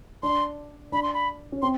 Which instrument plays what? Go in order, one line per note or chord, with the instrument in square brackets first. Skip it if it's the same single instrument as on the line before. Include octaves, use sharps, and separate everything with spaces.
[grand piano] D4 [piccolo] C6
[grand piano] D4 [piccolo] B5
[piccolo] C6
B5
[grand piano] C#4
[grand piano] C4 [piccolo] C6